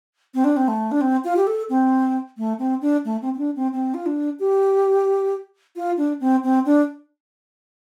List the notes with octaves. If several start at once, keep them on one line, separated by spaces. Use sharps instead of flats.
C4
D4
C4
A3
D4
C4
F4
G4
A4
C4
A3
C4
D4
A3
C4
C4
D4
C4
C4
F4
D4
G4
F4
D4
C4
C4
D4